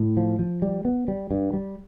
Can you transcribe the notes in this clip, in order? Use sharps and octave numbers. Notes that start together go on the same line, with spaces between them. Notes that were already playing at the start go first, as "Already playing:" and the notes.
Already playing: A2
F3
F3
G3
B3
G3
G2
G3